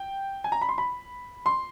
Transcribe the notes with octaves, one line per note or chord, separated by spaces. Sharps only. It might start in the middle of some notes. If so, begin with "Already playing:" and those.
Already playing: G5
G#5
A#5
B5
C6
B5
C6